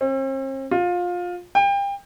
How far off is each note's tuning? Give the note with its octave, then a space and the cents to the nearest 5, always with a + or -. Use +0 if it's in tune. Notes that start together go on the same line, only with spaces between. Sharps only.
C4 +45
F4 +20
G5 +30